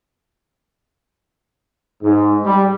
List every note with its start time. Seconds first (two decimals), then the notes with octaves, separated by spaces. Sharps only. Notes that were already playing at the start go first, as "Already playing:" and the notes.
2.02 G#2
2.44 G3